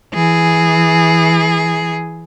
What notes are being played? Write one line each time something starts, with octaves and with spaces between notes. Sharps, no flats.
E3 G#4